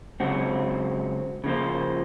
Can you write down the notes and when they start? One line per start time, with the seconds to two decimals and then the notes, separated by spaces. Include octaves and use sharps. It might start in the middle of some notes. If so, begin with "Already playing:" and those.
0.20 C#2 C#3 F#3 C4 F#4
1.44 C#3 F3 A#3 F4 C5